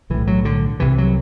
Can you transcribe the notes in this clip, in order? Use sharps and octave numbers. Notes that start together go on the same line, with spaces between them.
B1 A2 E3
F#3
D3
C2 C3 E3
F#3